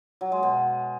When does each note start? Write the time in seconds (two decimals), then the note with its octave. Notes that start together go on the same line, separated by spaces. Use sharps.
0.21 F#3
0.32 G#3
0.43 B2